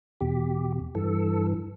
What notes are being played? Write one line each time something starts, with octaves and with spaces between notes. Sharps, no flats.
E2 B2 G4
G2 E3 A4